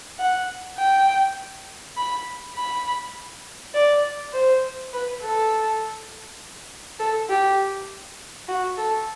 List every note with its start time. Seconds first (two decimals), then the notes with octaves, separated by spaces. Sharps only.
0.19 F#5
0.78 G5
1.97 B5
2.56 B5
3.74 D5
4.33 C5
4.93 B4
5.22 A4
6.99 A4
7.29 G4
8.48 F#4
8.77 A4